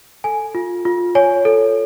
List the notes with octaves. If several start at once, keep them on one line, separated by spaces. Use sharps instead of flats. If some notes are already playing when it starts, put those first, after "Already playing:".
A4 G#5
F4
F4
C#5 G#5
A4